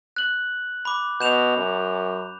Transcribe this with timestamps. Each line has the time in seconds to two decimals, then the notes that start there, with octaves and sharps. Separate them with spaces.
0.17 F#6 F#7
0.85 B5 D6
1.21 B2 G6 E7 F7
1.57 F#2